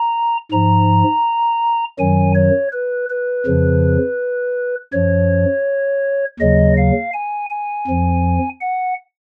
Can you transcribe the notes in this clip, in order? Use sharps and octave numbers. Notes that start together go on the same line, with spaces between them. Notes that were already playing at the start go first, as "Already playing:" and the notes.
Already playing: A#5
G#2 F3 A#5
F#2 D#3 F#3 G#5
C#5
B4
B4
F2 C#3 F3
F#2 F3 C#5
D#2 C#3 F#3 D#5
F5
G#5
G#5
F2 F3
F#5